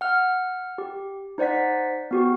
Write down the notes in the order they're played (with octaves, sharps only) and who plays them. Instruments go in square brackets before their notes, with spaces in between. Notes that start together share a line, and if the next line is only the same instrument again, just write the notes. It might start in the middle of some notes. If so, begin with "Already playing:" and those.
[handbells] F#5 F6
G4
D#4 C5 D5 F#5 B6
B3 F#4 G4